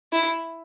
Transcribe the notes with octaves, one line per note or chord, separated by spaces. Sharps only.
E4